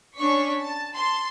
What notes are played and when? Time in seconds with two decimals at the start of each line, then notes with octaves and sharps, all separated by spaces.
0.17 C#4 D4 C#6 B6
0.63 A5
0.95 A5 C6